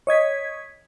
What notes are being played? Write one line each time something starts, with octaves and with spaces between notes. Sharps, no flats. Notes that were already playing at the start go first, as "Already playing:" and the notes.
C#5 D#5 G#6 B6